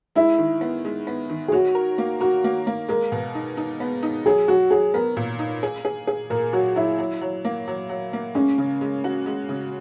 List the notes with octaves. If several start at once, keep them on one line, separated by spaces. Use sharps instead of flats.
G#3 E4
D#3
B3
G#3
B3
D#3
G#4
F#4 C#5
A#4
A#3
F#4 A#4
A#3
A#3
G#3 A#4
B2
D#4
D#4
B3
D#4
F#3 G#4
F#3 F#4
F#3 G#4
B3 A#4
A#2
D#4
G#4
G#4
G#4
A#2 A#4
F#3 F#4
F#3 E4
F#3
F#3
A#3
F#3
F#3
A#3
G#3 C#4
C#3
G#3
F#4
G#3
C#3